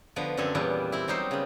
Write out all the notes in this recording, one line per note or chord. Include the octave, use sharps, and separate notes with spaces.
D3 F3 B3
F#2 D3 C4 A4 G#5
E2 A#2 G3 B3
C4 E4
F#3 G3 D#4 C5
C#3 B3